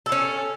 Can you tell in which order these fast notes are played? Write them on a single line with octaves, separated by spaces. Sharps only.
A4 E4 C#4